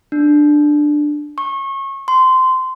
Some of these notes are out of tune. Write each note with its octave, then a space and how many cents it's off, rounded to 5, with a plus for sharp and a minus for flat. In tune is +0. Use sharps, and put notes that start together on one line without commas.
D4 +10
C#6 -25
C6 -15